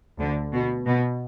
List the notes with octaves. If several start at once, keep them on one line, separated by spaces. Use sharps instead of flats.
D2 D3
B2
B2